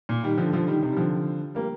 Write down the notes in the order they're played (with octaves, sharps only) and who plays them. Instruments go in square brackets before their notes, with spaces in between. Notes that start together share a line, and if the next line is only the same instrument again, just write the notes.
[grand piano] A#2
D#3 G3
D3 F3
D3 F3
D#3 G3
C3 D#3
G3
D3 F3
G3 A#3